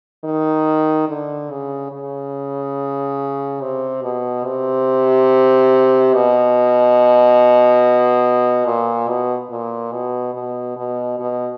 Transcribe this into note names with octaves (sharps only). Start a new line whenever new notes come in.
D#3
D3
C#3
C#3
C3
B2
C3
B2
A#2
B2
A#2
B2
B2
B2
B2